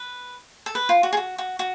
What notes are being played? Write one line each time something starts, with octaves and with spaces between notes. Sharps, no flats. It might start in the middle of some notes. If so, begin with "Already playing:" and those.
Already playing: B4
A4
B4
F4
F#4
G#4
F#4
F#4
F#4